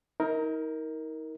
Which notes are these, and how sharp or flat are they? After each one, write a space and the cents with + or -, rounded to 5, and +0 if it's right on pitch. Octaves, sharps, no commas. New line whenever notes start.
D#4 +35 A#4 +0